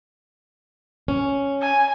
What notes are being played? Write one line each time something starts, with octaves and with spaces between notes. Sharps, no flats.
C#4
G#5